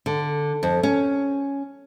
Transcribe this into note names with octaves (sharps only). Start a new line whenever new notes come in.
D3
F2
C#4